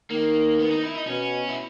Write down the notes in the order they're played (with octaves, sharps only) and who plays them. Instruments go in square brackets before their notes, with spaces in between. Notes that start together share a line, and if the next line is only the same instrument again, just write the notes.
[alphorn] D#3 [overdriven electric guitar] A#3
[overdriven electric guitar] B3
D#4
E4
D#4
[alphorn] B2 [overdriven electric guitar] C#4
[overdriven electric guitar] E4